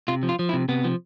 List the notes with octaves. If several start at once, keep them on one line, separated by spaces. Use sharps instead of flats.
C3 F4
F3
F4
F3
E4
C3
C3 B3
F3